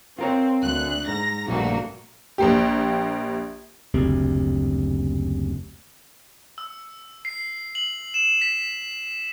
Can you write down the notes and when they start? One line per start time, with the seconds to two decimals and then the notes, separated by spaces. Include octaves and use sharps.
0.19 C4 F4 A#4 C#5
0.63 D2 F#6
1.08 G#2 A#5 A#6
1.48 A#1 G2 A3 A#3 F#4
2.38 A#1 A#3 G4
3.94 F#1 D2 C3
6.58 E6
7.25 C7
7.75 F#7
8.14 E7
8.41 B6